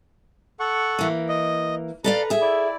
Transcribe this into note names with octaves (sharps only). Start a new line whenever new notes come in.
A4 F#5 C#6
E3 A#3
D#5
A4 B4 D5 F5 A#5
G#4 E5
E4 D5